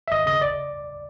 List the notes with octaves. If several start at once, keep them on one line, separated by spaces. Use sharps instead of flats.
E5
G#1 D#5
C#3 D#5
D5